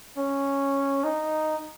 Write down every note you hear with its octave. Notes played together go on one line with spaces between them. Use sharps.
C#4
D#4